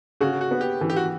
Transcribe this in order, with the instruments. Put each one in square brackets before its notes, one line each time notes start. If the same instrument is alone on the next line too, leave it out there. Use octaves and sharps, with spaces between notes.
[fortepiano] C#3 [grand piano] F#4
[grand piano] F#4
[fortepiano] B3
[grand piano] G4
[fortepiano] E3
[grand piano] G4
F#4